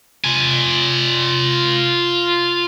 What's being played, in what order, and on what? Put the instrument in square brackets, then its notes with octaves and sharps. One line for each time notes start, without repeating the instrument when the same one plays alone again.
[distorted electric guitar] F4 G#5